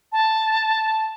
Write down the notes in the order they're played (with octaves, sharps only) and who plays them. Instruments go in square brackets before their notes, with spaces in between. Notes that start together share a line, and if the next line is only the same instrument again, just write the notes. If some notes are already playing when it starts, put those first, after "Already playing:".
[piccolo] A5